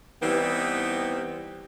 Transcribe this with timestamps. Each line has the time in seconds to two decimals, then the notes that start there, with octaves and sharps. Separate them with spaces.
0.23 E3 G3 B3 C4 D#4